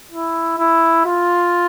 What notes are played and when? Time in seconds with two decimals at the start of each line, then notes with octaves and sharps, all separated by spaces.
0.12 E4
0.59 E4
1.06 F4